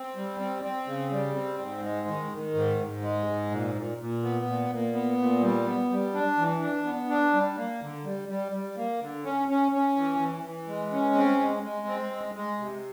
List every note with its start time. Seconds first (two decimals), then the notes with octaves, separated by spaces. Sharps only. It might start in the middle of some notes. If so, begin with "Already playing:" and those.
Already playing: C4
0.16 G3
0.40 C4
0.63 C4
0.87 C#3
1.11 G3
1.36 C4
1.59 G#2
1.82 G#3
2.07 D#3
2.31 D#3
2.54 G#2
2.79 G#2
3.02 G#3
3.26 G#2
3.51 A#2
3.75 A#2
3.98 A#2
4.23 B3
4.45 A#2
4.70 A#2
4.93 B3
5.18 A#2
5.41 G3
5.66 B3
5.90 G3
6.14 D4
6.38 E3
6.61 D4
6.85 B3
7.09 D4
7.33 G3
7.57 A#3
7.81 D3
8.04 G3
8.28 G3
8.52 G3
8.76 A#3
9.01 D3
9.24 C#4
9.48 C#4
9.72 C#4
9.96 E3
10.19 E3
10.44 E3
10.68 G#3
10.92 C#4
11.15 C4
11.39 G#3
11.63 G#3
11.87 C4
12.12 G#3
12.35 G#3
12.59 C3